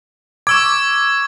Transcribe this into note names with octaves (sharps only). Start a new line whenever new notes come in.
C#6 D6 E6 G#6